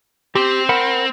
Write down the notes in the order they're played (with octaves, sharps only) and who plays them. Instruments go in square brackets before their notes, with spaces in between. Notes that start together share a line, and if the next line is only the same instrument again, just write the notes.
[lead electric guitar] C4 [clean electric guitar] G4
[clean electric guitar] A#4 F#5 B5